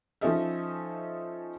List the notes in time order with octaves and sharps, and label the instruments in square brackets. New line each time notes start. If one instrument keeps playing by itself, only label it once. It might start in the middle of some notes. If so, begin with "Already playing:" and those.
[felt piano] F3 C#4 D#4 A4 D#5 E5